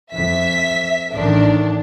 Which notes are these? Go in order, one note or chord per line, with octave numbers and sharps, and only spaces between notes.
F2 E5 B6
A1 D#3 D4